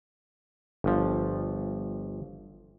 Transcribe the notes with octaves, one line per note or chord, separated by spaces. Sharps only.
G1 F3